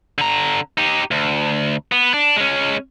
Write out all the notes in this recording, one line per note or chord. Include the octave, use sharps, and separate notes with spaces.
D3 A#5
D#4 G4
D2
B3
D4
G#3 C#4